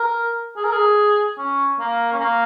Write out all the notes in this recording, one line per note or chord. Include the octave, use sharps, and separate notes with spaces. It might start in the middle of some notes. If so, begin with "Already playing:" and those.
Already playing: A#4
G#4
A#4
G#4
C#4
A#3
C#4
A#3